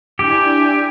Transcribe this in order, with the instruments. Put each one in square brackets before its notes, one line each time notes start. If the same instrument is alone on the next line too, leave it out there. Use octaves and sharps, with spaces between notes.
[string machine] D4 E4 G#5 [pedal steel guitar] G4